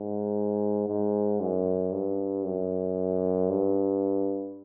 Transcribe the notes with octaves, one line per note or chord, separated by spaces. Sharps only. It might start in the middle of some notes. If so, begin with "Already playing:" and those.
Already playing: G#2
G#2
F#2
G2
F#2
G2